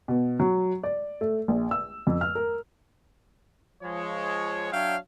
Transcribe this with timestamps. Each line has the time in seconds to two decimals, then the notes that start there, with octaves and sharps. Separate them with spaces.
0.08 B2
0.40 F#3
0.83 D5
1.21 A3
1.48 A#1
1.71 E6
2.07 F2
2.21 F6
2.35 A#4
3.83 F3 G#3 C#5
4.72 F#3 D4 C#5 E5 F5 G5